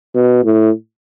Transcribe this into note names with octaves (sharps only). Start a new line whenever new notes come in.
B2
A2